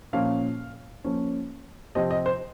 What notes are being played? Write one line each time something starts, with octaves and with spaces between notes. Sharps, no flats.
A#2 F3 A#3 C#4 F5
F3 A#3 C#4
C3 F3 C4 D#5
D#5
C5